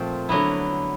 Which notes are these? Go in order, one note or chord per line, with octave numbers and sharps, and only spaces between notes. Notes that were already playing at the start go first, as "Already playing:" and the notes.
Already playing: A#2 F3 A3 C4
D3 F#3 B3 E4